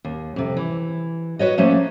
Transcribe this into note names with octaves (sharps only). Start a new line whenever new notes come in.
D#2
F2 C3
E3
F#4 B4 C#5 D#5
F3 A3 A#3 C#4